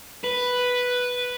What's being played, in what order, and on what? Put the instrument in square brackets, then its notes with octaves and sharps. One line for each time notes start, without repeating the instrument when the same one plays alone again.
[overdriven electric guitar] B4